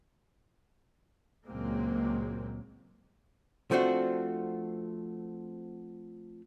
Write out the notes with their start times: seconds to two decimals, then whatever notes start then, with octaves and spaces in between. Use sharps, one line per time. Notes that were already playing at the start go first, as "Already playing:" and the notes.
1.46 C#2 A#2 F#3 G#3 A#3 C4
3.71 F3 A3 C4 D4 F#4